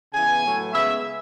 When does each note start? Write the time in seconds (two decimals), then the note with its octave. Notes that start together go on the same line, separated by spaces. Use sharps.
0.14 C#3 E3 B3 G#5
0.44 A2 F#3 A3
0.72 C#3 G#3 B3 E5